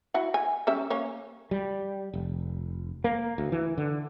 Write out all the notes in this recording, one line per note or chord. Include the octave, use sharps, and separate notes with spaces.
E4 F#4 F#5
G#5
G3 C#4 E5
A#3 C#4 C#5
G3
F1
A#3
D2
E3
D3